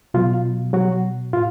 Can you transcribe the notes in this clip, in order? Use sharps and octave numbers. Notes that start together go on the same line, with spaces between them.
B2 F#3 F4
F#3 F#4
A2 F4